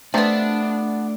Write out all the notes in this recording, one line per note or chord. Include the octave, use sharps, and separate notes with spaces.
C3 A3 B3 D4 F4